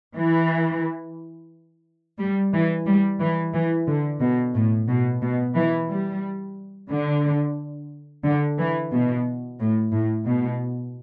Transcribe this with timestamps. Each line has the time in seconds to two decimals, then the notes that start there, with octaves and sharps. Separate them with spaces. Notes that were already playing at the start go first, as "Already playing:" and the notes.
0.16 E3
2.19 G3
2.53 E3
2.86 G3
3.20 E3
3.53 E3
3.87 D3
4.21 B2
4.55 A2
4.88 B2
5.22 B2
5.55 E3
5.89 G3
6.90 D3
8.24 D3
8.58 E3
8.92 B2
9.59 A2
9.93 A2
10.26 B2